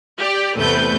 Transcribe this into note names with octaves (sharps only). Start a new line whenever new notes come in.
G4 D5
E2 C3 A3 B4 G6